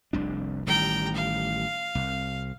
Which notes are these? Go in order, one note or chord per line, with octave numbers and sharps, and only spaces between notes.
F1 C2 D4
A1 D#3 G3 G5 A#5
F5
C2